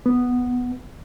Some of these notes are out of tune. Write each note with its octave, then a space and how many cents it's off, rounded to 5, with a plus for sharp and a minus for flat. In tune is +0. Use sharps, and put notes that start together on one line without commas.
B3 +0